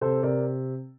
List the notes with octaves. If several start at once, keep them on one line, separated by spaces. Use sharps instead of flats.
C3 A4 C5
C3 A#4 D5